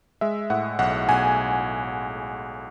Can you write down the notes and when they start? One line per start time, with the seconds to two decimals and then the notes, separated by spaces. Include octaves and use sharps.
0.21 G#3 E5
0.50 A2 F#5
0.79 B1 F#5
1.09 B1 G#5